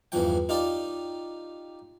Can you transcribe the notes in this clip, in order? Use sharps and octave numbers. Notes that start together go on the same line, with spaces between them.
E2 G2 C#3 F3 G5
D#4 F4 G4 D5